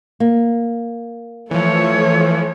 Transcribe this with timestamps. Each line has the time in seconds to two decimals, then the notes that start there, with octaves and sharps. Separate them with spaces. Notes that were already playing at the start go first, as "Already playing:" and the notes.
0.20 A#3
1.51 E3 F3 A3 C#5